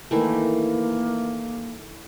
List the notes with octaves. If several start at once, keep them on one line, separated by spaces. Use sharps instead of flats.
D#3 E3 A3 A#3